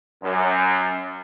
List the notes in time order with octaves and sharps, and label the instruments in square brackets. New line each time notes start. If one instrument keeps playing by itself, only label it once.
[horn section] F#2